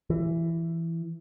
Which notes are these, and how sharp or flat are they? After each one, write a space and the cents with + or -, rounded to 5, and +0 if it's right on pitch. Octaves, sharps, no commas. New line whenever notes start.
E3 +10